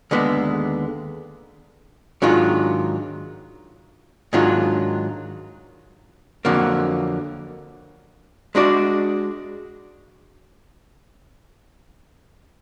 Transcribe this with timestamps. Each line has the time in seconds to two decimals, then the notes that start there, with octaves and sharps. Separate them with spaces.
0.11 D#2 D3 G#3 B3
2.22 G#2 D#3 F#3 D4 F4
4.33 G#2 D#3 F#3 D4 F4
6.45 F2 D3 F#3 A#3
8.55 G#3 D4 F#4 D5